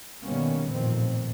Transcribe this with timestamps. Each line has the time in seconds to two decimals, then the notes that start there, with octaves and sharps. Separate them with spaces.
0.25 B2 D#3 G3 A#3 B3 C#4
0.72 A1 F2 A#2 D#3 C4